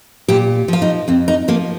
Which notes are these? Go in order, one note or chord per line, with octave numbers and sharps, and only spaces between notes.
A#2 G4
F3 F4
D#4
F2 C4
D#4
F3 A#3